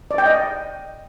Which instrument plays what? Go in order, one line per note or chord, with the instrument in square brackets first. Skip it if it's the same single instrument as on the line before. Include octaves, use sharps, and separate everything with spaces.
[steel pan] D5
G5
D#5